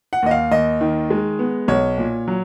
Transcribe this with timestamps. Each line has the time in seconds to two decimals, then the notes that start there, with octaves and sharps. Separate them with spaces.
0.13 F#5
0.22 D#2 D#5
0.31 F5
0.51 D#2 D#5
0.81 D#3
1.10 G#3
1.39 B3
1.68 B1 C#5
1.98 A#2
2.28 F#3